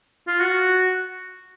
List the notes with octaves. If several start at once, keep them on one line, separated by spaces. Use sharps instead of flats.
F4
F#4